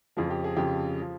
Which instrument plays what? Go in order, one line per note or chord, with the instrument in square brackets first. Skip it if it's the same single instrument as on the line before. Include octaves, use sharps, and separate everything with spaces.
[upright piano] F2 C#3 F3 G#4
G4
G#4
F2 C#3 F3 G4
F3